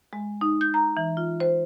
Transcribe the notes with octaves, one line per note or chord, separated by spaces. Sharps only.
G#3
D#4
G6
A#5
E3
F4
C5